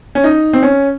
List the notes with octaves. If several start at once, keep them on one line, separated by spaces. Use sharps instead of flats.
C#4
D#4
C4
C#4